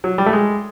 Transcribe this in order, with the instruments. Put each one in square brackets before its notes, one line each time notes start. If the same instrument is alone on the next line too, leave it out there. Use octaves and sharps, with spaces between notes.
[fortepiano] F#3
G3
A3
G#3